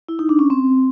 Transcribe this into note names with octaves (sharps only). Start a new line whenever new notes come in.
E4
D#4
D4
C#4
C4